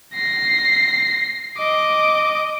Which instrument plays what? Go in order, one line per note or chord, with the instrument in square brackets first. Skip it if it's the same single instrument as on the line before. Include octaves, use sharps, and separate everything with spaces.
[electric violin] A#6 C7
D#5 D6